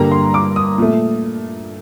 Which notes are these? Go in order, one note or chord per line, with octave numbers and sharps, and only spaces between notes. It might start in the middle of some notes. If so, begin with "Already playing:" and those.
Already playing: G2 D3 G3 A#3 A#5
C6
D6
D#6
A#2 A3